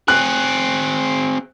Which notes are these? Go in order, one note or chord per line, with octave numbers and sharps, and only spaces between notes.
C4 G#4 F#6